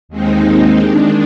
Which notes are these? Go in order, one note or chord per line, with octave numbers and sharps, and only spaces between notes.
D#2 D#3 G#3 C4 D#4
D#3 G#3 D4